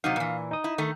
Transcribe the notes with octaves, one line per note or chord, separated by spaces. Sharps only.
C3 F#3 D#4 F5
A#2 E3
D#4 D#6
E4
D#3 A3